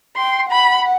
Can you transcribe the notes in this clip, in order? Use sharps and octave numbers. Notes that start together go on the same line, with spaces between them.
G5 C6
F#5 B5